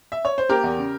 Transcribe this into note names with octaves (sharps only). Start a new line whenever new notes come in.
E5
C#5
C5
A#3 G4 A#4
E2
C#3